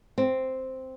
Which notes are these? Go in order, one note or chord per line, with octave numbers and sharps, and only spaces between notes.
C4